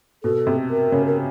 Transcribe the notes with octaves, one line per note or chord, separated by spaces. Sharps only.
B2 A4
C3
A#4
C#3
A#4